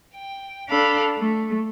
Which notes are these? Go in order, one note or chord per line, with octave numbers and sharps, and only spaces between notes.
G5
D4 A4 F5 B5
A3